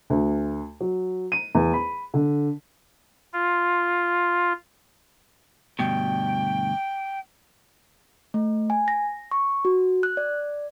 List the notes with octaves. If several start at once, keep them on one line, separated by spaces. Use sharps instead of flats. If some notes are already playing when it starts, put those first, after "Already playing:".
D2
F#3
D#7
E2
B5
D3
F4
D2 G2 B2 G5
A3
G#5
A#6
C#6
F#4
F#6
D5